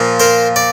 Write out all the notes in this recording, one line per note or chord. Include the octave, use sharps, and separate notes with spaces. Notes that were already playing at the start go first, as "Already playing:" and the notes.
Already playing: A#2 F3
A#4 C5
D5